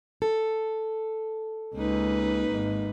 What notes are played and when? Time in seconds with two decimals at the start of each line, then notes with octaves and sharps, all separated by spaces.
0.22 A4
1.74 C#2 A#3 D#4 B4
2.50 G#1